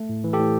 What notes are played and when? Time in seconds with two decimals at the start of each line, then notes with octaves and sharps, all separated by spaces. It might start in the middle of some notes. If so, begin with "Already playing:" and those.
Already playing: A3
0.09 A2
0.24 E3
0.33 G4 A4
0.39 A2